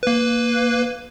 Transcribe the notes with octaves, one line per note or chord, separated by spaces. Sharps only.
A#3 B4